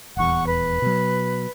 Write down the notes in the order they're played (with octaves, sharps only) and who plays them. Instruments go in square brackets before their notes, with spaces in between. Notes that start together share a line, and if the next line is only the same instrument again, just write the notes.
[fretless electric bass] D#1 E2 [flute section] F#5 C#6
[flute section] B4
[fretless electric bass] B2 F#3